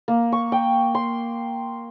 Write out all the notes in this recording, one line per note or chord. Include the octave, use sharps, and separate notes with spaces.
A#3
C#6
G5
C6